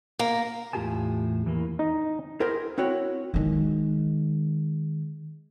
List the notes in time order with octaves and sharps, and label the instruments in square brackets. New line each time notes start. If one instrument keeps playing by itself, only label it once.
[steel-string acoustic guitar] A#3
[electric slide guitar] E2 A2 F4 G4 G#5 A5
E2 E3 A#3
[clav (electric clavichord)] D#4
[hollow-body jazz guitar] E4 G#4 A#4 C5 G5
C4 E4 F#4 C#5
[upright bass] D#3 G#3